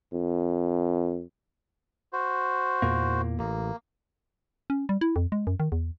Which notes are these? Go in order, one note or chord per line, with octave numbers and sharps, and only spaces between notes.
F2
F#4 C5
E2 A#2 A#3
A1 A#3
C#4
G3
E4
F2
G#3
F#2
D#3
E2